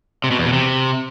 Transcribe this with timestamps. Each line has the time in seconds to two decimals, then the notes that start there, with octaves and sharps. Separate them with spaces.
0.24 C3
0.31 B2
0.38 E2
0.46 B2
0.53 C3